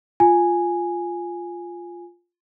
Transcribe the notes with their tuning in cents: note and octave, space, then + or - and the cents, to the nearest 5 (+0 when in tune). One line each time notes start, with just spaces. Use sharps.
F4 +0 G#5 +0